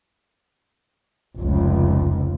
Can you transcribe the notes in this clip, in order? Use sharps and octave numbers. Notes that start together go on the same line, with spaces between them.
F1 C#2